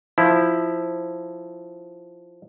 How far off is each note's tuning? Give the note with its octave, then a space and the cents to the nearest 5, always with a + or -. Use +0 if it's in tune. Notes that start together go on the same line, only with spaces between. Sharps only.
F3 +0 E4 +0